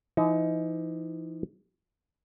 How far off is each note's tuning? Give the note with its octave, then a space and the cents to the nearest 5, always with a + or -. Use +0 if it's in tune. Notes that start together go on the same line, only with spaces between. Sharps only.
E3 +45 D#4 +25